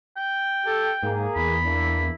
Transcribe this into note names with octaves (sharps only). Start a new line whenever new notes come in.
G5
G4 A4
G#2 A#3 G#4
E2 B5
A#3 D4 E4